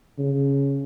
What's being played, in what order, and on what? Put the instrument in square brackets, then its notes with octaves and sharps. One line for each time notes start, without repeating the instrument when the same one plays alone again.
[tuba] C#3